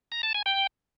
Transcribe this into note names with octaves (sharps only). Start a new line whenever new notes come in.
A#5
A5
G#5
G5